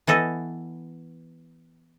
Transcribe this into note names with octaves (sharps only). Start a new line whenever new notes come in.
E3 B3 A4 D#5